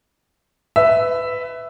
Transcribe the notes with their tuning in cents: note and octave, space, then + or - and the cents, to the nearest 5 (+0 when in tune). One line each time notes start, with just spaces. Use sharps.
B4 +20 E5 +0